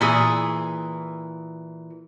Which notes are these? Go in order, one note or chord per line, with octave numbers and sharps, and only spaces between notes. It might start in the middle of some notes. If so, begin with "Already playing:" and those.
A#2 E3 G#4